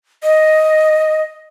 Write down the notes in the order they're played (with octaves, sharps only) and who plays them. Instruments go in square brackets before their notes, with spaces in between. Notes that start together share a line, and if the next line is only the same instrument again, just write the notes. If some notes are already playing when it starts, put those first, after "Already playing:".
[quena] D#5